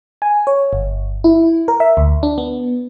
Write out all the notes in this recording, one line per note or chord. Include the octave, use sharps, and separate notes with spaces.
G#5
C#5
G1
E4
A#4
E5
D2
D4
B3